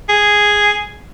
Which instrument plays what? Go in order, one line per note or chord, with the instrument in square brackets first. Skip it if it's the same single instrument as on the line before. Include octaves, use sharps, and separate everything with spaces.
[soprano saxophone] G#4